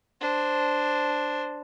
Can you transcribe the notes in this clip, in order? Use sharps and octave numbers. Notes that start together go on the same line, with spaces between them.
D4 C5